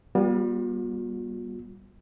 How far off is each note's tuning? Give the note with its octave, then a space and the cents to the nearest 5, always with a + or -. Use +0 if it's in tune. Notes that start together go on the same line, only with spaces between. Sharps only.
G3 +0 B3 -40 F4 +40